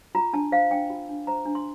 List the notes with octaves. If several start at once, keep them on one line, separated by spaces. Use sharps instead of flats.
F4 A#5
D4 A5
C5 F5
D4 G5
F4
D4
C5 A#5
D4
C6